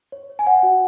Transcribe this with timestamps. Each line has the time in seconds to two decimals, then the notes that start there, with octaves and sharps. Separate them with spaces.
0.12 C#5
0.30 C#5
0.39 G#5
0.47 C#5 F#5
0.63 F#4